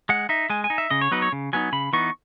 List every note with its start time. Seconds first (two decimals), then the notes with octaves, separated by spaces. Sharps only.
0.09 G#3 F#5
0.29 D#4 E5
0.50 G#3 G#5
0.64 G#5
0.70 D#4
0.78 E5
0.90 C#3 D#5
1.01 C#5
1.11 F#3 B3 D#4 B4
1.22 C#5
1.32 C#3
1.53 F#3 B3 D#4 G#5
1.72 C#3 B5
1.93 E3 B3 D#4 C#6